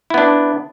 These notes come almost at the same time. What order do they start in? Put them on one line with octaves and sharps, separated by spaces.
E4 B3 D4